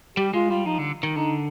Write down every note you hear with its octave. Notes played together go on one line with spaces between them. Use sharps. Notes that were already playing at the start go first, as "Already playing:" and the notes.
G3 G4
G#3 F4
G3 F4
F3 D#4
D3
D#3
D3 D#4